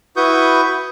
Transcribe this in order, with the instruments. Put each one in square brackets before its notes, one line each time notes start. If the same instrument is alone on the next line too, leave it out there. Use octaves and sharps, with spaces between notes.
[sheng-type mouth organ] E4 F#4 B4 C#6 D#6 G6